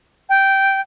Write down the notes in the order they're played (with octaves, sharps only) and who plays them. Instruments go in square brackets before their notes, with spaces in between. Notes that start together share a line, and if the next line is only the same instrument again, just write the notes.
[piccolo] G5